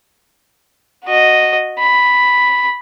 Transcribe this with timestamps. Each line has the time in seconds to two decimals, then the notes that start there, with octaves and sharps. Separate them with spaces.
1.05 F#4 D#5
1.79 B5